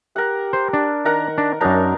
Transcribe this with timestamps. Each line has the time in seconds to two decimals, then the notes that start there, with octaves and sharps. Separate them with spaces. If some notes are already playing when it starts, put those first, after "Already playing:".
0.16 G4 A#4 F#5
0.53 C5
0.73 D4
1.05 D#3 A#4 F#5 A#5
1.38 D4
1.61 F#2 F#3 D4 D#4 A#4 A#5